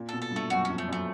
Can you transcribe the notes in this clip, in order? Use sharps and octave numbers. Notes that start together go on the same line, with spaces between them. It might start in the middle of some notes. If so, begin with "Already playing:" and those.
Already playing: A#2
A4
B2
A4
G2
A3
F#2 F#4
F2 C#4
A3
F#2 A3